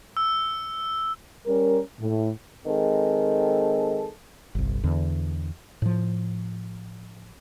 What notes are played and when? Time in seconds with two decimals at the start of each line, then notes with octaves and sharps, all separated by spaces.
0.17 E6
1.46 G3 C#4 A#4
1.99 A2
2.66 D#3 G#3 C4 A4
4.55 G1 C2
4.84 E2 D3
5.82 A2 F3